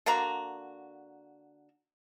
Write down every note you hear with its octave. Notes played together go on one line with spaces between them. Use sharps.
D3 A#3 F#4 A#5